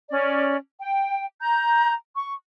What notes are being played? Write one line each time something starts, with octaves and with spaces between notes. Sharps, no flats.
C#4 D5
G5
A#5 G6
C#6